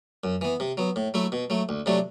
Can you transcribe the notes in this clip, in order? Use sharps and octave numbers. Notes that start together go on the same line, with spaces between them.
F#2
E3 B3
C3
F#3 B3
A2
F#3 A3 E4
B2
F#3 A3
D2
C3 F#3 A3 D4